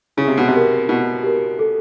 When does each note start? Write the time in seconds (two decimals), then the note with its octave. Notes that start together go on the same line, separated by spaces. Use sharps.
0.17 C#3 E4
0.27 C3
0.38 B2
0.48 C3
0.53 G4 A#4
0.89 B2 E4
1.23 G4 A#4
1.59 A4